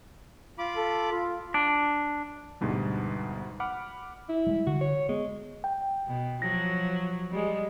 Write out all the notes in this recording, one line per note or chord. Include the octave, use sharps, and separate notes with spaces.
F4 B5 D6
A4
F4
D4
D2 G#2 B2 G3
F#5 B5 D6 F6
E4
G3 G#3
D3 F#4
C#5
G#3 B3
G5
B2
F3 F#3 A#6
G3 G#3